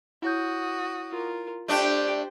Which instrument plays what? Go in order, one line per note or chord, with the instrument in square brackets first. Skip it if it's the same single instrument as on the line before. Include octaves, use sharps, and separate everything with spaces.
[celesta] E4 C#5 G6 [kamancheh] F#4 D#6
[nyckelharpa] F4 A#4
[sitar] A3 D4 [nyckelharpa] G4 G5 [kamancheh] C5